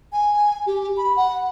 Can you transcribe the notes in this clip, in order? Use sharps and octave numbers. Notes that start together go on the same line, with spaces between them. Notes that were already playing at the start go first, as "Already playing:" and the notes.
G#5
G4
B5
F#5